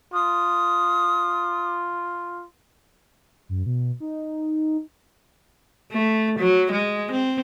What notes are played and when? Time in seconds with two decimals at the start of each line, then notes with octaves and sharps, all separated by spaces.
0.14 F4 D#6
3.49 F#2
3.66 B2
4.00 D#4
5.92 A3
6.39 F#3
6.72 G#3
7.11 C4